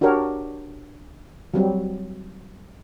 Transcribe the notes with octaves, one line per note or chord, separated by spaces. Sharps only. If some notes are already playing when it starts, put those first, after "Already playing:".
D4 F#4 G4 A#4 C#5
F#3 G3 C4